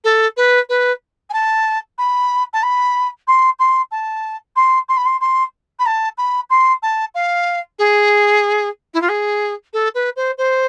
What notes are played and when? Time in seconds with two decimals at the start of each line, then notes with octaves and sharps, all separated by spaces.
0.04 A4
0.36 B4
0.69 B4
1.29 G#5
1.33 A5
1.98 B5
2.53 A5
2.63 B5
3.27 C6
3.59 C6
3.91 A5
4.56 C6
4.88 C6
4.97 B5
5.05 C6
5.21 C6
5.79 B5
5.86 A5
6.17 B5
6.50 C6
6.82 A5
7.14 F5
7.78 G#4
8.94 E4
9.01 F4
9.09 G#4
9.73 A4
9.94 B4
10.16 C5
10.38 C5